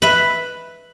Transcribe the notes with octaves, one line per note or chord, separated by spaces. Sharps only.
B4 E5